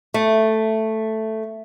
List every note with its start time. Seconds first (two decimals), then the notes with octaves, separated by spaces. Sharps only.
0.14 A3